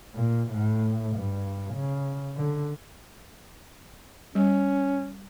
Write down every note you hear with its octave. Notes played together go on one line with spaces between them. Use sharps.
A#2
A2
G2
C#3
D3
G3 C#4